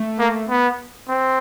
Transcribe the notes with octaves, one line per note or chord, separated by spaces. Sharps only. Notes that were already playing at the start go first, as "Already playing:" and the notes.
Already playing: A3
A#3
B3
C4